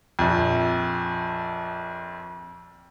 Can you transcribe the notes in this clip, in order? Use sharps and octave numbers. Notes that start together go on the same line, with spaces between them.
A#1 F2